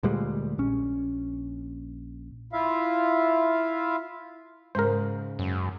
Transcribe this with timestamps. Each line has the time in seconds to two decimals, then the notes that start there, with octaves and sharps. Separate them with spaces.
0.03 D2 A#2 G3 G#3
0.58 A#1 C#4
2.53 E4 F4 E5 F5
4.75 G#2 C#3 G#3 A#4 C5
5.39 F#2